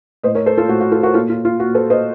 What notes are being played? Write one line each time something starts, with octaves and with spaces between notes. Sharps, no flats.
A2 C5 D#5
A#4 C#5
A4 C5
F4 A4
A2 F#4
F#4
F4 A4
F#4 A#4
A#2 F4 A4
F4
F4
A#2 F#4
A4 C5
C5 D#5